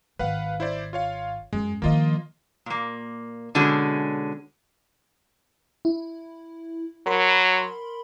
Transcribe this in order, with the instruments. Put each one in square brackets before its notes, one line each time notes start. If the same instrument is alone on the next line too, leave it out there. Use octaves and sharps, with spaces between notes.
[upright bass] G#1 [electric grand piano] B4 F5 F#5
[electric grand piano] E4 C5 D5
F4 C#5 F5
[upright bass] F#2 [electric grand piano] G#3
[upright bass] D#3 F3 [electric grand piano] A#3 F4 D#5
[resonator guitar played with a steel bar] A#2 A#3
B2 D3 G#3 C#4 F#4
[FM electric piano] E4
[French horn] F#3 [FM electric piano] A#4 B5 C6